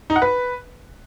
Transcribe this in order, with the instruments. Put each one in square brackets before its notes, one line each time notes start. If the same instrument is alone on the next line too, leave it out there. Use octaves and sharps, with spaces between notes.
[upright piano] D#4
F#5
B4